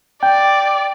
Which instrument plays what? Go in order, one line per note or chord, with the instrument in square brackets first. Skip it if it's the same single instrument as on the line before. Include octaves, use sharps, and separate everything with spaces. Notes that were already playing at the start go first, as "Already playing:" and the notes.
[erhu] D5 [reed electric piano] G5